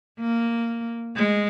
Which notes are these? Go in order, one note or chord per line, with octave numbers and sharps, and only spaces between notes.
A#3
G#3